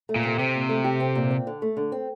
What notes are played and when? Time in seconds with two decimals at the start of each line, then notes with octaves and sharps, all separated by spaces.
0.09 A3
0.16 A#2
0.23 C3
0.39 C3 C4
0.55 A#2
0.69 A3
0.84 G4
1.00 C4
1.15 A#2
1.31 C4
1.47 D3
1.62 A3
1.77 D3
1.92 C4